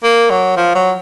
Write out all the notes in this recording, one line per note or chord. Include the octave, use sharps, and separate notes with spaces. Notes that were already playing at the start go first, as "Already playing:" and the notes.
A#3
F#3
F3
F#3